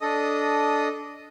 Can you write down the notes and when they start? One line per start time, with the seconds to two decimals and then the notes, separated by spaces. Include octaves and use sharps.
0.01 D4 A4 D#5 D#6